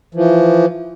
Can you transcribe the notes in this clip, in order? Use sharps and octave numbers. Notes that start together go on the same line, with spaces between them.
E3 F3